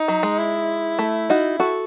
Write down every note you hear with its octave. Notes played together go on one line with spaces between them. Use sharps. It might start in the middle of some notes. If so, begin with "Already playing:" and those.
Already playing: D#4
F#3
G#3
E4
A3
D#4 F#4
F#4 A4